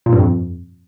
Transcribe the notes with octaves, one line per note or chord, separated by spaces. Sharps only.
A#2
G2
F2